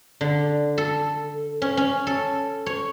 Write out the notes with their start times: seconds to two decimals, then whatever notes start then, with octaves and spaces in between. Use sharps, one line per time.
0.21 D3
0.78 A4
1.62 C#4
1.77 C#4
2.07 A4
2.66 C#5